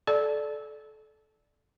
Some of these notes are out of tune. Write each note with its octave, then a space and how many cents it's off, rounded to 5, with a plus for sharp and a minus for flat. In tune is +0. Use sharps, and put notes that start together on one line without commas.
A4 -25 D5 +0 A5 -15